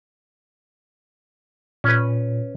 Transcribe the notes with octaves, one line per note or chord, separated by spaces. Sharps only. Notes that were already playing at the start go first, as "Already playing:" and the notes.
A#2 C#4 B4